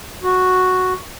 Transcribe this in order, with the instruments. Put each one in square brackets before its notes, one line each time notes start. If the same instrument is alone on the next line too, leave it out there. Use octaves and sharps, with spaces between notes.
[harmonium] F#4